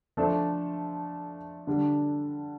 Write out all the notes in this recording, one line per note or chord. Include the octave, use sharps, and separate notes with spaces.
F3 A3 D4 A4 C5
D3 G3 D4